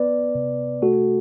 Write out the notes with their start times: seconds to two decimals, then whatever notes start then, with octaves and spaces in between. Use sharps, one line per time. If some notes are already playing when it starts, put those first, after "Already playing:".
Already playing: B3 B4 D5
0.35 C3
0.82 A3 F#4 A4